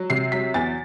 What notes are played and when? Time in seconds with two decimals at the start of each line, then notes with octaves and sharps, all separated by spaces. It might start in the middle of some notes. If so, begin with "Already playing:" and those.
Already playing: F#3
0.10 C3 C7
0.32 F#3 B6
0.54 E2 A6